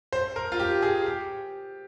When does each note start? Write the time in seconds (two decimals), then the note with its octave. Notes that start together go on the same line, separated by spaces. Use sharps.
0.13 C5
0.36 A#4
0.52 F4
0.60 G4
0.82 G#4
1.06 G4